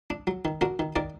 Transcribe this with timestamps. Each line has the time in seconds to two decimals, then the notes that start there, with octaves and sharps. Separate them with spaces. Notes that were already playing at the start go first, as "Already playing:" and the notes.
0.10 D4
0.27 F#3
0.45 D#3
0.61 D4 F#4 A#4
0.79 D#3
0.96 D#3 A#4 D5